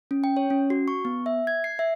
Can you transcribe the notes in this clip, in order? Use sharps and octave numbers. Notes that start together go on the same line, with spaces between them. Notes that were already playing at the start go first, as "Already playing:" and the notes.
C#4
G5
C#5
C#4
F#4
C#6
B3
E5
G#6
C7
E5